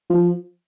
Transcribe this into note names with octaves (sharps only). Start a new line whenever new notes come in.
F3